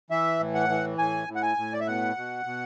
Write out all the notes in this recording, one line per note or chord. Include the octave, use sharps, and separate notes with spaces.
E3 E5
A2
F#5
E3
A2 G#5
A2
F#5
G#5
A2
D5
E5
B2 F#5
B2
B2